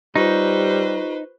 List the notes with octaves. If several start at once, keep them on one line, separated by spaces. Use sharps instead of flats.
G3 D#4 F4 G4 B4 C5 C#6